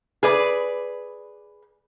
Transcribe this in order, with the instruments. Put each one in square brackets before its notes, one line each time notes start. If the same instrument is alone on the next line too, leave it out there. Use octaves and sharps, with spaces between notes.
[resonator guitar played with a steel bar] G#4 B4 D5